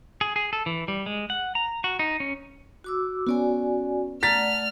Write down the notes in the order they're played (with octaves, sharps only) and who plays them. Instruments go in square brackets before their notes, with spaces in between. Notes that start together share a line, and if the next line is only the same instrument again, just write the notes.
[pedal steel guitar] G#4
G#4
A4
E3
G3
G#3
F#5
A#5
F#4
D#4
C#4
[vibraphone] F#4 D6 E6
[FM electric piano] B3 C#4 [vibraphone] F#4 D5 G#5
[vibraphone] A3 D5 F#5 [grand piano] A#5 A6 B6 [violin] F6